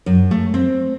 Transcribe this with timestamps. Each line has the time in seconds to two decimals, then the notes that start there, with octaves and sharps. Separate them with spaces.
0.06 F#2
0.31 A3
0.54 C4